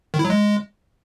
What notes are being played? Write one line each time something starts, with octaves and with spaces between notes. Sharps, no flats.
D#3
E4
F#3
G#3